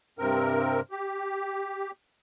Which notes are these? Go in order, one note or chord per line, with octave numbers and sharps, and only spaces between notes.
G2 C3 C4 A#4
G4